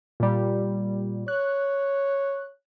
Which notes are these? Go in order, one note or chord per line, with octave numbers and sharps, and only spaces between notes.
A#2 G3
C#5 F#6